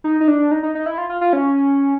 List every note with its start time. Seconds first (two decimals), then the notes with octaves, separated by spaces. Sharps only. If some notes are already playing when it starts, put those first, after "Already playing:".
0.04 D#4
0.20 D#4
0.28 D4
0.51 D#4
0.63 D#4
0.75 D#4
0.86 E4
0.98 F4
1.09 F4
1.21 F4
1.33 C#4